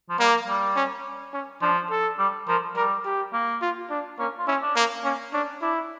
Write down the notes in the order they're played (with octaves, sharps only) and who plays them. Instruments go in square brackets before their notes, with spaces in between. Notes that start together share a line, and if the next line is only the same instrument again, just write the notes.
[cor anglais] F3
[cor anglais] G3 [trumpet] A#3
[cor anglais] G3
[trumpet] C#4
C#4
[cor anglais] F3 [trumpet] D4
[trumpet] A4
[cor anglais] G3
[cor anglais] F3 [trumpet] A#4
[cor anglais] G3 [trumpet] A#4
[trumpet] G4
[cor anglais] A#3
[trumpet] F4
D4
[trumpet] A#3 [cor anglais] C#4
[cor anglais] F4
[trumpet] C#4 [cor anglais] E4
[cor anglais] D4
[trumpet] A#3
[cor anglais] A#3 [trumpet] C#4
[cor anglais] C#4 [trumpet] D4
[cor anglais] D4 [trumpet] E4